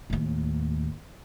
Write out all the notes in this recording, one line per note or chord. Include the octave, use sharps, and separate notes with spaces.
D#2 A2